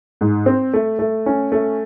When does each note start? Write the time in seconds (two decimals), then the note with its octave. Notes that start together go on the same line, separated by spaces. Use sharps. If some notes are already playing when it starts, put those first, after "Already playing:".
0.21 G#2
0.46 C4
0.74 A3
0.99 A3
1.26 C#4
1.52 A3